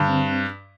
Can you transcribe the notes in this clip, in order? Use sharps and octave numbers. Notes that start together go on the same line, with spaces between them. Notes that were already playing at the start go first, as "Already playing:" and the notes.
Already playing: G2 D3
C4